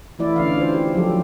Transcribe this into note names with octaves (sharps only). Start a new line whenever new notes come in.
E3 A3 E4 D5
D3 C#4 F5
F4 C5
G4
F3 F#3 G4 A4